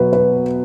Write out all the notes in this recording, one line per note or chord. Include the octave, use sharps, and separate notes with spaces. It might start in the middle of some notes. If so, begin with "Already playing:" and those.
Already playing: B2 F#3 B4
B4